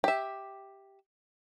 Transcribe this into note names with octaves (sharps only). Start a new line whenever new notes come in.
G4 E5